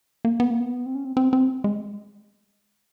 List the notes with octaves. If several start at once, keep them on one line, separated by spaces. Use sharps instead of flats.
A#3
B3
A#3
B3
C4
C#4
C4
C4
C4
G#3